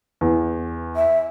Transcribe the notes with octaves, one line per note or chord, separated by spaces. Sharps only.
E2
E5